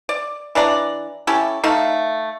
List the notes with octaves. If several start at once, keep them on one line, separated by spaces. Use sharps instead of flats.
D5
E3 D4 D5 A#5
C#4 E4 G4 A4
A3 D#4 A4 F5